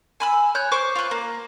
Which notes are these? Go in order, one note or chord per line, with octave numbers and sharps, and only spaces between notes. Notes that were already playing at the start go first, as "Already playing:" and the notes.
G#5 B5 E6
C#5 F#6 G6
C5 C#6 D6
F4 B4
A#3